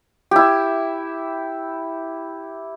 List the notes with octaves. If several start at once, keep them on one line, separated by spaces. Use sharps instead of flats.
E4 G4